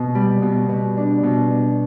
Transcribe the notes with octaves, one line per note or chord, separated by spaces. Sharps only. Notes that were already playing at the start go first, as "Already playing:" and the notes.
Already playing: B2
G3
B2
B2
D4
B2
D4